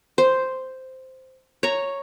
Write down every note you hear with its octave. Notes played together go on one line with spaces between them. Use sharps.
C5
C#5 A#5